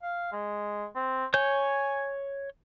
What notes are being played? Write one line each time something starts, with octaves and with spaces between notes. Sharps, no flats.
F5
G#3
C4
C#5 G#5 G6